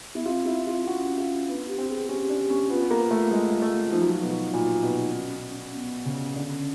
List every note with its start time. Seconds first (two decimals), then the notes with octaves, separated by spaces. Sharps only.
0.15 B3 E4
0.26 C4 F4
0.46 E4
0.67 F4
0.87 C#4 F#4
1.18 F4
1.48 B3 D4
1.68 G4
1.79 C4
1.89 G#4
2.09 C#4 G4
2.30 D4
2.50 C#4
2.70 B3 F4
2.81 B3
2.91 A#3
3.11 A3
3.31 G#3
3.62 A3
3.92 F3 D#4
4.02 F#3
4.11 F3
4.22 B2
4.54 A#2
4.83 B2
5.14 C#4
5.34 C#4
5.55 C#4
5.75 B3
6.05 C#3
6.36 D3 C#4